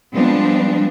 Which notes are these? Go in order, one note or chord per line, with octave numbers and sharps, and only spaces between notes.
F3 G3 G#3 B3 C4 D4